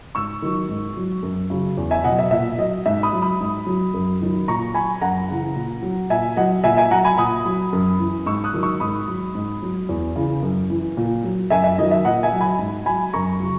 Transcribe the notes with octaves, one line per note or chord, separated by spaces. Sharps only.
G#2 C#6 E6
D#3 F#3
G#2
F#3
F#2
C#3 F#3
E2
E5 G#5
B2 F#3 D#5 F#5
E5
A#2 E5
F#3 D#5
G#2 E5
B5 D#6
F#3
B5 D#6
G#2
F#3
F#2
D#3 F#3
A#2 A#5 C#6
F#3 G#5 B5
F#2 F#5 A#5
C#3 E3
A#2
F#3
A#2 E5 G#5
F#3 D#5 F#5
A#2 E5 G#5
E5 G#5
F#3 F#5 A#5
G#5 B5
A#2 B5 D#6
F#3
F#2
E3
G#2 C#6 E6
D#6 F#6
D#3 F#3
C#6 E6
G#2 B5 D#6
F#3
G#2
F#3
E2
C#3 E3
F#2
E3
A#2
F#3
F#2 E5 G#5
E5
D#3 F#3 D#5
E5
A#2 D#5 F#5
E5 G#5
F#3
G#5 B5
G#2
F#3 G#5 B5
F#2 A#5 C#6
C#3 F#3